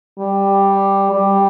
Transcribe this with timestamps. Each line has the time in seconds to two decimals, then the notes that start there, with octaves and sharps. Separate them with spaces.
0.19 G3
1.13 G3